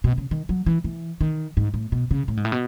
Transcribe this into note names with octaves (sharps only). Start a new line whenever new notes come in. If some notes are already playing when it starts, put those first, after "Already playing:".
B2
C#3
D#3
F#3
E3
E3
D#3
G#2
A2
B2
C#3
A2
G#2
A2
B2